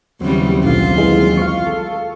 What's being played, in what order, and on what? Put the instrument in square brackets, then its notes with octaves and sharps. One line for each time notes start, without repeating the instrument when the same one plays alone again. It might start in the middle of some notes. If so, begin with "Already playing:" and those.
[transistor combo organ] D#2 F#3 C4 [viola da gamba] C#3 E3 G3
[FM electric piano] B1 D3 F5 [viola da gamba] F4
[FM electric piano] E3 G#3
F5 C#6
[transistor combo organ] A4